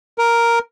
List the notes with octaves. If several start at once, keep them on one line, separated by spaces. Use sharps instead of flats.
A#4